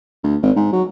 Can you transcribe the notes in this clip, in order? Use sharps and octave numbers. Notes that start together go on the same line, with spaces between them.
D2
G#1
G#2
F#3